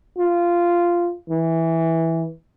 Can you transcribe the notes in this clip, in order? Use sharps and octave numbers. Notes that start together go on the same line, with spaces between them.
F4
E3